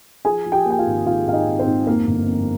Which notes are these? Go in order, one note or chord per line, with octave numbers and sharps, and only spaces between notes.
F3 G#4 G#5
F3
G4 G5
A#3
G5
F4 F5
G#1
G#1 F4 F5
G#1 F5
D#4 D#5
G#1
C4 C5
G#2
F2 A#3 A#4
G1
F2